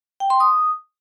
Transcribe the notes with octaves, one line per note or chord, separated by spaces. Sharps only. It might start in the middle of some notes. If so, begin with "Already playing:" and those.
G5
C6
D#6